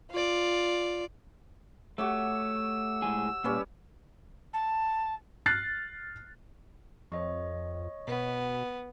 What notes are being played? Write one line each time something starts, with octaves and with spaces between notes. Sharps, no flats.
F4 D5
A3 F#4 G4 C#5 E6
A2 G#3 G#4
A#2 G3 C#4 B4
A5
F6 F#6 A6 C7
F2 C#5 D#5 C#6
B2 B3